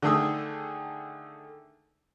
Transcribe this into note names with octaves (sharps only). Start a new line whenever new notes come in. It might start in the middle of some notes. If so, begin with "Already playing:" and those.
D3 D#3 A3 G#4 D#6 E6